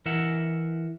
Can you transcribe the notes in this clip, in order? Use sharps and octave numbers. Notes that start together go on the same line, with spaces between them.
E3 A#4 E5 F#5